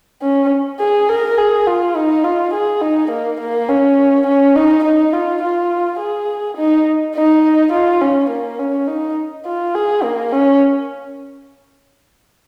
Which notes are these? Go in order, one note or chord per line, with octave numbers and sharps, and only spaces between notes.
C#4
G#4
A#4
G#4
F4
D#4
F4
G#4
D#4
A#3
A#3
C#4
C#4
D#4
D#4
F4
F4
G#4
D#4
D#4
F4
C#4
A#3
C#4
D#4
F4
G#4
A#3
C#4